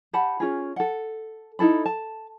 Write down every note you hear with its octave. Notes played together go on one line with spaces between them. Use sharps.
G4 F#5 A5 B5
C#4 F4 G#4
A4 F#5
D#4 E4 A4 B5
A5